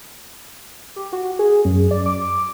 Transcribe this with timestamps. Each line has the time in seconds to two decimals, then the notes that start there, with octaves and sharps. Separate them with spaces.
0.96 G4
1.13 F#4
1.39 G#4
1.65 F#2
1.91 D5
2.06 D6